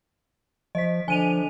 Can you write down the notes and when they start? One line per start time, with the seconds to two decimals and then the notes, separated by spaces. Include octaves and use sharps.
0.75 F3 D#5 B6
1.08 D3 F3 G#5 D#7 F7